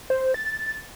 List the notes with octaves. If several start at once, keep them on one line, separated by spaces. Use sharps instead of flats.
C5
A6